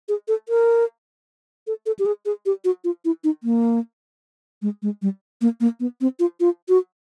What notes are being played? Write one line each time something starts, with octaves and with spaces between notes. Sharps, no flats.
G#4
A4
A#4
A4
A4
G4
G#4
G#4
G4
F#4
F4
E4
D#4
A#3
G#3
G#3
G3
A#3
A#3
B3
C4
F4
F4
F#4